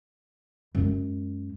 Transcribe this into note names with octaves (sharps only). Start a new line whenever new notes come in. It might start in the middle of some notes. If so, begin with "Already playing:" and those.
F#2 G#3